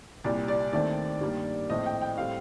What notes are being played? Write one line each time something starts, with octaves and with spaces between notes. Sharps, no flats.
C2 A#2 G3 D5
D5
D#2 D#3 A3 C4 D5
G2 D#3 G3 A#3
A#1 A2 A3 C4 D#5
G5
G5
A2 G3 C4 F5